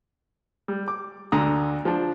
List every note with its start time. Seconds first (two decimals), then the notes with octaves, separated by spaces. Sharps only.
0.68 G3
0.88 D6
1.32 D2 D3 A#5 D#6
1.85 F3 D4